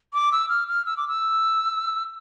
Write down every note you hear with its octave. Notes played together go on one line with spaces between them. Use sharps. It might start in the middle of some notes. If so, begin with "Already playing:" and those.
D6
E6
F6
F6
E6
D6
E6